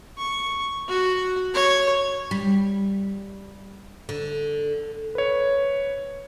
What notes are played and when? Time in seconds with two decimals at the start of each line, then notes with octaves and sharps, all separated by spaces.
0.17 C#6
0.88 F#4
1.54 C#5
2.31 G3
4.09 D3
5.15 B4 C#5